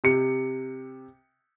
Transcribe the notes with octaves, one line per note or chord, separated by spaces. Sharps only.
C3 C#7